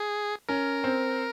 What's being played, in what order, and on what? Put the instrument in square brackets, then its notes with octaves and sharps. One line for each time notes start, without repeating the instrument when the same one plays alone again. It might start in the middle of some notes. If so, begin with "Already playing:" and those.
Already playing: [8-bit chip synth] G#4
[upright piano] C#4 [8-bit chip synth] A#4
[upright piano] C4